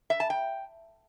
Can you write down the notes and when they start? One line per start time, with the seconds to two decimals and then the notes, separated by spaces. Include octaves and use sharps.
0.10 E5
0.20 A5
0.30 G5